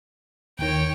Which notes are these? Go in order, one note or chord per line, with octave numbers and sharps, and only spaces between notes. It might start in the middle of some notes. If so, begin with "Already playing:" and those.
D#2 D#3 C#5 G5